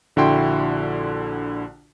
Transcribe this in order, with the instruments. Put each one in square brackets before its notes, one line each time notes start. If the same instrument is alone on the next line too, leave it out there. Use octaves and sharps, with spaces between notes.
[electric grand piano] A#1 D3 E4 F#4 G5 C6